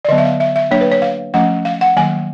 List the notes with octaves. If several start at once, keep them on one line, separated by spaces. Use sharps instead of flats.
D5
D3 F#3 B3 D#5
E5
F5
E5
E5
F#3 A#3 D4 C#5
B4
C#5
F5
F3 A3 C#4 F#5
F5
F#5
D#3 F#3 A#3 G#5